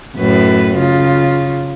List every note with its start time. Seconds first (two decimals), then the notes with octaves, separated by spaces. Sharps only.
0.17 F#2 A2 B4
0.77 C#3 F4